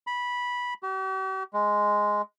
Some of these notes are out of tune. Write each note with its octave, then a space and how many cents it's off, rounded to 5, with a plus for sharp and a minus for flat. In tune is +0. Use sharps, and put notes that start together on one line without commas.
B5 -10
G4 -45
G#3 +0